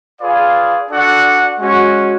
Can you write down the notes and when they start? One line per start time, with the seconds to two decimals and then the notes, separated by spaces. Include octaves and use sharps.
0.20 F4 G#4 B4 D5 F5
0.90 D4 F#4 A4 D5 F#5
1.58 G#3 C#4 F#4